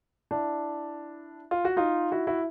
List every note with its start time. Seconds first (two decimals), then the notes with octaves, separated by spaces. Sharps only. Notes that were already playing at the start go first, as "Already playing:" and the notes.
0.31 D4 E4
1.51 F4
1.65 F#4
1.77 D#4 F4
2.12 E4 F#4
2.27 E4 F#4